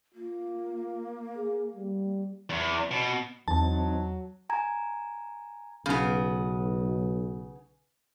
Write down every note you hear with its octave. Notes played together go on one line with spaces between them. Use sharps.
A#3 F4
G#4
G3
E2
B2
E2 E3 F#3 C4 D#4 A5
G#5 A#5 G#6
B1 C#3 B3